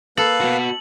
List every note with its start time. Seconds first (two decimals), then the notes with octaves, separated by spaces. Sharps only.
0.17 A#3 A4 B4 F5 F#7
0.40 B3 F#4